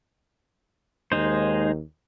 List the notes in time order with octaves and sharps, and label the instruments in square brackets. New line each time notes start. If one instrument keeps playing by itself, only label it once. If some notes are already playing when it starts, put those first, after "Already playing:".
[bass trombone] D#2 [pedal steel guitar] G#3 D#4 C5